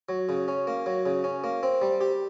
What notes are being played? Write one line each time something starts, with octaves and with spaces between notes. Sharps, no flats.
F#3
C#3
C#4
A#3
F#3
C#3
C#4
A#3
C4
G3
G4